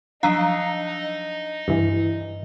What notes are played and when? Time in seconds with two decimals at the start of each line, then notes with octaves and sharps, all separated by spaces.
0.23 F3 F#3 D4 D#4 F5 A#5
1.68 G2 E3